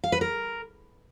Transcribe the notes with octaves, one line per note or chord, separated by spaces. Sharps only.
F5
B4
A#4